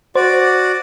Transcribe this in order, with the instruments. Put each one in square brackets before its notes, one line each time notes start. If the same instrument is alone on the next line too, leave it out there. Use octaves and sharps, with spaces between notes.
[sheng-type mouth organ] F#4 D5 [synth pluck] C5